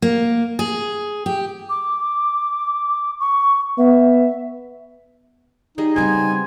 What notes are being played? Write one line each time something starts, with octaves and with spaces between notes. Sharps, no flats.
A#3
G#4
G4
D6
C#6
B3 E5
G3 D#4 G#4 D#5
C#3 G3 B3 C4 C5 G#5